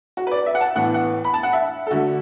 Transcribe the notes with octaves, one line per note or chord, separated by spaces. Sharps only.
F#4
B4
D5
E5
F#5
A5
A2 E3 B3 F#5
F#5
B5
A5
F#5
E5
A4
D3 A3 F#4